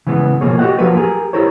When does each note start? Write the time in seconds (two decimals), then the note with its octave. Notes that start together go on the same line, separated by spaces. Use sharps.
0.07 C#3 E3 G#3 B3
0.41 B2 F3 A#3 G#4 C#5
0.58 F#4 G4 A4 D#5 F#5 G5
0.79 F3 F#3 A#3 F4 F#4 B4
0.97 G4 G#4 A#4
1.33 E4 G4 A#4 C5 C#5